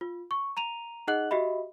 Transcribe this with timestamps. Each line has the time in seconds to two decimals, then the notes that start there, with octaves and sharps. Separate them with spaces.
0.01 F4
0.31 C#6
0.57 A#5 D#7 F7
1.07 D#4 G#4 D#5 F#5 F#6 F#7
1.31 F#4 G4 D#5 E5 B5